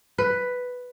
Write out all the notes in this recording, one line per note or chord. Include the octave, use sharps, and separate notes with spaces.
B4